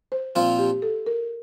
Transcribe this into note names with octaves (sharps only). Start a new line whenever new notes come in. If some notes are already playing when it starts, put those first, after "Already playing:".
C5
A#2 F3 C4 F4 C5
G4
A4
A#4